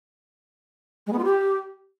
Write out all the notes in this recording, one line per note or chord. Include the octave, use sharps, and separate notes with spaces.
G#3
B3
F4
G4